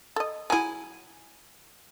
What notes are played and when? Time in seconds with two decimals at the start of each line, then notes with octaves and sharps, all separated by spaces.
0.16 A4 D#5
0.50 F#3 E4 G#4 G#5